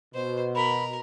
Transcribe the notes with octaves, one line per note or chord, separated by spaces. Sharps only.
B2 C5
A#4 B5